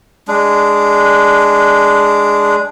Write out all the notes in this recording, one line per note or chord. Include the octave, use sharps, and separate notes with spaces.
G#3 D4